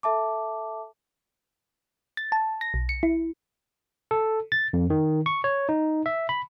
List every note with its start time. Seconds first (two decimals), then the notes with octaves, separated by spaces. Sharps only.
0.03 A4 E5 A5 D6
2.17 A6
2.32 A5
2.61 A#6
2.74 B1
2.89 C#7
3.03 E4
4.11 A4
4.52 A6
4.73 F2
4.90 D#3
5.26 C#6
5.44 C#5
5.69 D#4
6.06 E5
6.29 B5